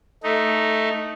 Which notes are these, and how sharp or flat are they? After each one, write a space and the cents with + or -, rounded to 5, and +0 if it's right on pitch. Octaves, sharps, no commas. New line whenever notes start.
A3 +0 D#4 +0